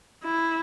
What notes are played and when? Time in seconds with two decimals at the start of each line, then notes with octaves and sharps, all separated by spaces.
0.24 E4